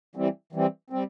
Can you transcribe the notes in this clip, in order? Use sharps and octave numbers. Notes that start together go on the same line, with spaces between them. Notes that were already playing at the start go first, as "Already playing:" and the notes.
E3 G3 C4
E3 G3 C4
G3 C4